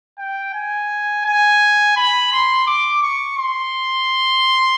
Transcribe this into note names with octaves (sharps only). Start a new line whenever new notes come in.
G5
G#5
G#5
B5
C6
D6
C#6
C6